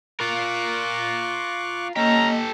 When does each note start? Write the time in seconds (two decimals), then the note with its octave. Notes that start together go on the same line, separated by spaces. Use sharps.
0.20 F4 A#4 C#6 D6 F#6
1.96 A#3 C#4 G4 A4 D#5 A#5